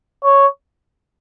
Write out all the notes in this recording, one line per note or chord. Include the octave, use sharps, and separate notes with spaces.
C#5